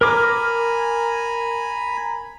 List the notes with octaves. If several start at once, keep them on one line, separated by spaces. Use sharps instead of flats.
A#4 G#5 A#5 B5 D6